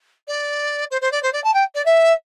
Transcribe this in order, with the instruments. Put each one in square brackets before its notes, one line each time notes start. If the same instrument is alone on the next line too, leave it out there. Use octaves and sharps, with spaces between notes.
[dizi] D5
C5
C5
D5
C5
D5
A5
G5
D5
E5